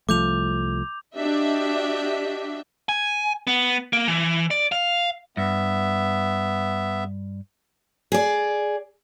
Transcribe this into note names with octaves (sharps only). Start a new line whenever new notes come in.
C2 F3 A3 D6 G6 F7
D4 F#4 G4 D#5 E5
G#5
B3
A#3
E3
D5
F5
G2 B3 E5
G#4 D5